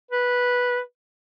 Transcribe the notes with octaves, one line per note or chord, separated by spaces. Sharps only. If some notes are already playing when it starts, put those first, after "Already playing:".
B4